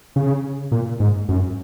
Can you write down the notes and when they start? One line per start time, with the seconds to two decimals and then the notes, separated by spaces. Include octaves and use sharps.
0.16 C#3
0.72 A#2
1.00 G#2
1.29 F#2